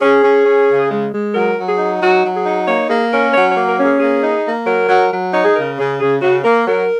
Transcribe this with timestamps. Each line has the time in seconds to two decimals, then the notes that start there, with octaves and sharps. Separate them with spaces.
0.01 C#4 G#4
0.24 C#4
0.46 C#4
0.69 C#3
0.91 G#3
1.12 G#3
1.34 F#3 A#4
1.56 F#3
1.68 G#4
1.78 D#4
2.01 F#3 F#4
2.24 F#3
2.34 G#4
2.45 D#4
2.67 A#3 C#5
2.89 A#3 G#4
3.12 C#4 A#4
3.34 F#3 C#5
3.50 C#5
3.56 A#3
3.67 A#4
3.79 C#4 G#4
4.00 A#3 G#4
4.22 D#4
4.45 A#3
4.66 F#3 A#4
4.89 F#3
5.11 F#3
5.33 D#4 C#5
5.44 G#4
5.55 C#3 A#4
5.78 C#3 G#4
6.00 C#3 G#4
6.21 C#3 F#4
6.43 A#3 A#4
6.67 F#3 A#4